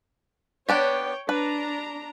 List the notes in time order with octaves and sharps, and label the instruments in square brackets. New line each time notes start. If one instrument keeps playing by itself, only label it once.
[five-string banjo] B3 D4 G4 [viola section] C#5 G5
[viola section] D4 A#5 [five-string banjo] B4